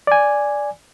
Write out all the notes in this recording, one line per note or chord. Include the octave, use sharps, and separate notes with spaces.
D5 G#5